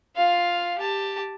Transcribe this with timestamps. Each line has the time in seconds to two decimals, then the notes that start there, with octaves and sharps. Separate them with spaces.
0.16 F4 F5
0.78 G4 A5